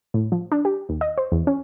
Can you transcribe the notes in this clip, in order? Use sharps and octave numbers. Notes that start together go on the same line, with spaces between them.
A2
F3
D4
G4
D#2
D#5
C5
E2
C#4